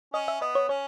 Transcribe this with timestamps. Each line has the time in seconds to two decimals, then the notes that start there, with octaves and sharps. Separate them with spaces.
0.13 C#4 D#5
0.28 E5
0.41 B3 D#5
0.55 C#5
0.69 C#4 C#5